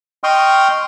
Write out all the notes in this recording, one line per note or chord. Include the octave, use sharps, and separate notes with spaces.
D#5 G5 C6 C#6 D#6 F6